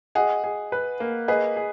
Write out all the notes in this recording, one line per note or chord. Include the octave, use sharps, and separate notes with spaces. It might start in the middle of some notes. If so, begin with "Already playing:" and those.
G#4 D#5 F#5
G#4
B4
A#3
G#4 B4 D#5
G#4